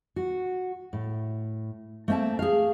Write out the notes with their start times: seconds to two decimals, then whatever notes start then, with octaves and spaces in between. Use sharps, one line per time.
0.16 F#4
0.93 A2
2.08 A3 A#3 C4 E5 A5
2.39 G#4 F5